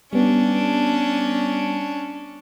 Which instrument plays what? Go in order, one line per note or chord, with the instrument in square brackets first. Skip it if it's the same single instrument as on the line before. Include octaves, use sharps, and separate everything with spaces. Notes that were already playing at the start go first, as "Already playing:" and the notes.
[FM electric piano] G3 B3 [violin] C#4 D4